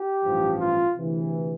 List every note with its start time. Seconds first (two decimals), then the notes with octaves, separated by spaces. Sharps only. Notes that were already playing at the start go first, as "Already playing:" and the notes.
Already playing: G4
0.23 A1 G2 F3
0.60 F4
0.96 D2 C3 E3